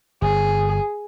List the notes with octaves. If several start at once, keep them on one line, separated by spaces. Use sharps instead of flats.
G1 G#4